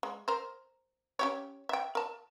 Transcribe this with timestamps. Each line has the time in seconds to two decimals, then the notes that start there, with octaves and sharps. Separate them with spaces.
0.03 G#3
0.28 A#4 C5
1.19 C#4 G4 C#5
1.69 E5 G5
1.95 A#4 A5